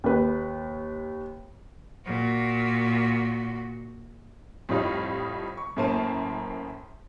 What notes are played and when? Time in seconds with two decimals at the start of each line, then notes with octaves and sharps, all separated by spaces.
0.04 D#2 B4
2.05 A#2 F#4
4.69 F2 A2 F3 G3 D#4 F4
5.57 C#6
5.76 F#2 A2 A#3 C5 A5 D#7